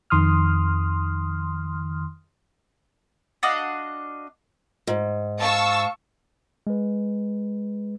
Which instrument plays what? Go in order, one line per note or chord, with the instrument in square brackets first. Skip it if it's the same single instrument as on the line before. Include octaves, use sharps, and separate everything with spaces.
[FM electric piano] F2 D#3 C6 D#6 F6
[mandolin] D4 F#4 D#5 F5
[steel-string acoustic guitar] G#2
[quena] F5 [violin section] A5 C#6 E6
[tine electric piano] G#3 B4